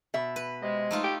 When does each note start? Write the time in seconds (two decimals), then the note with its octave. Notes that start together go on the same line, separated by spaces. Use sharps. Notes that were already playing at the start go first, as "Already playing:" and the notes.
0.14 B2 E5
0.36 B4
0.62 C3 G#3 D#5
0.91 A3 D#4 F4
1.03 G4